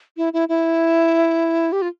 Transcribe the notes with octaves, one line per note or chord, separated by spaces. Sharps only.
E4
E4
E4
G4
F4